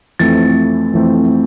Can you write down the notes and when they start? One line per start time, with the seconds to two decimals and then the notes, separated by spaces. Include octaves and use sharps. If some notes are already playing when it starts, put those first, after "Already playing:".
0.19 F2 E3 A3 C4 A6
0.94 F2 E3 A3 C4